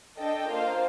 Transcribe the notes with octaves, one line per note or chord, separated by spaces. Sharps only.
D4 A4 D#5 G5
A#3 F4 C5 F5